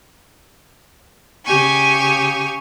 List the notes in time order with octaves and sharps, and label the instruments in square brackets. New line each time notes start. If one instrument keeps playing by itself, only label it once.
[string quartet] C#3 G4 G#5 C#6